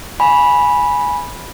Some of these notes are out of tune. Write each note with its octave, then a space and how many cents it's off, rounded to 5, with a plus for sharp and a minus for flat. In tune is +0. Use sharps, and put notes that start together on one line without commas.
G#5 +0 B5 -10